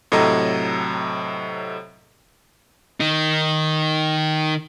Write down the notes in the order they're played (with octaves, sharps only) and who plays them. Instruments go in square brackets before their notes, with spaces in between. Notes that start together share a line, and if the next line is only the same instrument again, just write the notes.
[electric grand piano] A2 C3 F#3 A4 D#5 A#5
[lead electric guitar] D#3 D#4